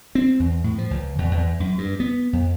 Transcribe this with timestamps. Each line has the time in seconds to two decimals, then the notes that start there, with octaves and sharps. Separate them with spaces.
0.15 C4
0.40 E2
0.64 A2
0.78 F3
0.91 C#2
1.18 E2
1.31 E2
1.60 F#2
1.78 G2
2.00 B3
2.33 F2